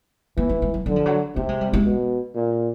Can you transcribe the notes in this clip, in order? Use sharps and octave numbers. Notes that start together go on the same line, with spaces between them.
E3 A#3
A3
G#3
F#3
D3 F#3
F3
F#3
C3 A3
G#3
G3
G#3
B2
A#2